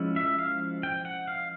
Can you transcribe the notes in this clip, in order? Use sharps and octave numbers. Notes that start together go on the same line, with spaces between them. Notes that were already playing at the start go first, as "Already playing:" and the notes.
Already playing: F3 G#3 C#4 E4
E5
F5
G5
F#5
F5